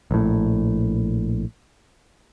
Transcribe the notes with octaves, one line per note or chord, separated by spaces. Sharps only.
A#1 A2